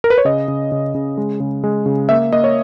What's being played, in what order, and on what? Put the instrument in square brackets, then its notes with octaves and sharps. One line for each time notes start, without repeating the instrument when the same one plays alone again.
[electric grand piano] A#4
B4
C#5
C#3 D#5
C#3
C#3
C#3
G#3
C#3
G#3
C#3
A#3 E5
A#3 D#5
C#5